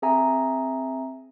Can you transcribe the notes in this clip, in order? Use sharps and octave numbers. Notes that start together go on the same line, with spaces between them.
C4 G#4 E5 G#5 A#5